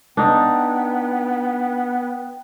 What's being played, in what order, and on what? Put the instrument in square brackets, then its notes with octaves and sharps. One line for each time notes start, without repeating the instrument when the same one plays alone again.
[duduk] B3 [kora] D4 D#4 D5 [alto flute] G5